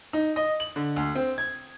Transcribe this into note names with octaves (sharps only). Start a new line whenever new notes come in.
D#4
D#5
F#7
D3
D2
C4
G#6